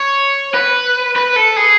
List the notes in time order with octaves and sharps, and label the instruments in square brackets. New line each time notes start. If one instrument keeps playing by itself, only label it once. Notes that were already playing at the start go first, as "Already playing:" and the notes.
Already playing: [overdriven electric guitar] C#5
B4
B4
A4
G#4